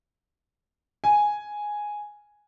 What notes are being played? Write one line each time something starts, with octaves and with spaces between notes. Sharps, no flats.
G#5